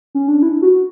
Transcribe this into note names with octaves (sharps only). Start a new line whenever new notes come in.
C#4
D4
E4
F#4